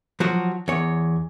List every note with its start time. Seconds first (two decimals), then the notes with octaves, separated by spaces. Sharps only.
0.20 F3 F#3 F#4
0.68 E2 C#5